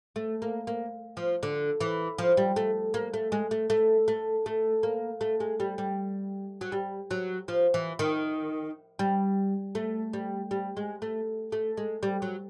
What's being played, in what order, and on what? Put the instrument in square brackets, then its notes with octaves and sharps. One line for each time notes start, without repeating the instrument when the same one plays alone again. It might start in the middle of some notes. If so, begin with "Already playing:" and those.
[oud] A3
A#3
A#3
F3
D3
E3
F3
G3
A3
A#3
A3
G#3
A3
A3
A3
A3
A#3
A3
G#3
G3
G3
F#3
G3
F#3
F3
E3
D#3
G3
A3
G3
G3
G#3
A3
A3
G#3
G3
F#3